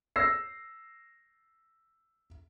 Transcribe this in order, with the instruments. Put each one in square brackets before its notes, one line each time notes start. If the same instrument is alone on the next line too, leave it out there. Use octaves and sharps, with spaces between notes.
[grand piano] E6 A#6 C7